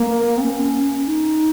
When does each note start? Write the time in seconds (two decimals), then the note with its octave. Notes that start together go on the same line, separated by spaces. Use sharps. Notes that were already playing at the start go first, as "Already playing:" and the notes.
Already playing: A#3
0.38 C4
0.41 C#4
1.06 D#4